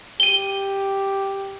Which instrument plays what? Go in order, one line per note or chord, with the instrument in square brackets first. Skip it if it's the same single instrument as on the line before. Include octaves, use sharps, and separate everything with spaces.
[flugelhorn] G4 [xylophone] D#7 G7